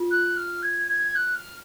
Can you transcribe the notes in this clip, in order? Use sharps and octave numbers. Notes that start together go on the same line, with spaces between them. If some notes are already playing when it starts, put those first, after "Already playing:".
Already playing: F4
F#6
F6
G#6
G#6
F#6
F6